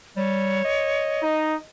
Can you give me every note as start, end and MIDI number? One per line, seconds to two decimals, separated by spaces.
0.17 0.64 55
0.17 1.22 73
0.65 1.65 75
1.23 1.55 63